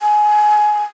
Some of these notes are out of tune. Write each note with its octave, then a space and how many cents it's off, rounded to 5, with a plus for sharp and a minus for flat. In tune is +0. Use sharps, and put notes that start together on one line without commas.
G#5 +15